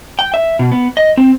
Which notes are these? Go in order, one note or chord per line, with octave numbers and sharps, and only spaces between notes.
G5
E5
B2
B3
D#5
C4